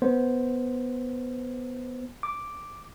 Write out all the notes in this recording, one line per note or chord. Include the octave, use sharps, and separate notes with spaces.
B3 C5
D6